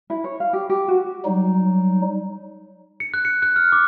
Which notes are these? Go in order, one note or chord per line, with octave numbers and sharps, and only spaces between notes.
E4
C#5
F5
G4
G4
F#4
F#3 G3 D#4
C#7
F#6
C#7
F#6
F6
D6